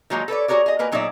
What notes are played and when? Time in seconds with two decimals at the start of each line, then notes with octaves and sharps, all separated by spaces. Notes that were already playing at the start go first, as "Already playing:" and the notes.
0.10 D#3 F#3 G#3 A#3 D#4 F4
0.28 A4 B4 C#5 D5
0.48 F#4 G#4 A#4 C#5 D5
0.66 G#4 D#5
0.79 A#3 A#4 B4 G#5
0.92 A#2 F#3 D#4 G#4 D5 E5